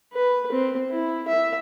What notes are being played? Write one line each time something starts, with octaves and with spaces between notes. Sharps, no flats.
B4
C4
E4
E5